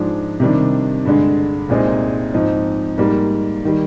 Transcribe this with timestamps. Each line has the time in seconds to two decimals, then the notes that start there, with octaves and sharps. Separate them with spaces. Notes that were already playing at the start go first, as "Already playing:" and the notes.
Already playing: G#2 F3 G#3 D4
0.40 C3 D#3 G3 D4
1.05 G2 D3 G#3
1.69 C2 A#2 G#3 C4 D#4
2.34 G#2 F3 C4 D#4
2.98 G#2 G3 A#3
3.65 D#3 G3